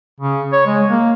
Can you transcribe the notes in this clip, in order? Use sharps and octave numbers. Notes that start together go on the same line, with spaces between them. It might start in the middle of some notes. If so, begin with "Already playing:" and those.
C#3
C#5
G#3
A#3